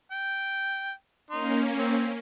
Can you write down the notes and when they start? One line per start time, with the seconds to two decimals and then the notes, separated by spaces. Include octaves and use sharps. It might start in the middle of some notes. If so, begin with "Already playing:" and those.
0.12 G5
1.31 A#3 C#4 D#4 C6
1.79 C4